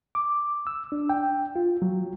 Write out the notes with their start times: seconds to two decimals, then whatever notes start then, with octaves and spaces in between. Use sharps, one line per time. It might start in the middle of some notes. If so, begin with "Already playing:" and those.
0.15 D6
0.67 E6
0.92 D4
1.09 G5
1.56 F4
1.82 F#3